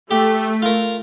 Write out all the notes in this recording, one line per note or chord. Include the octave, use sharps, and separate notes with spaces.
A3 G4
F4 A#4